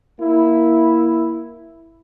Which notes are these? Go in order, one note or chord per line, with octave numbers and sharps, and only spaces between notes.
A#3 E4